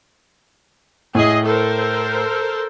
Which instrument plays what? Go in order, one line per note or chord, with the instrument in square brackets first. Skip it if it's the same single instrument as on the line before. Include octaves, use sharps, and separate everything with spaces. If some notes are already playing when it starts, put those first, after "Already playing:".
[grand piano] A2 [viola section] G#4 D#5
[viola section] A4 A#4 C5